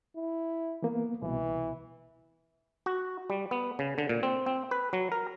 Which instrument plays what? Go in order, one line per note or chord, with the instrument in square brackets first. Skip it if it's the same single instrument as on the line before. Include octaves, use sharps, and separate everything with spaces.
[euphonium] E4
[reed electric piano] E3 A#3 B3
[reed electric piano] C2 B2 [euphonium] E3
[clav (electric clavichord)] F#4
G3
B3
C#3
D3
A#2
C4
C4
B4
F#3
A#4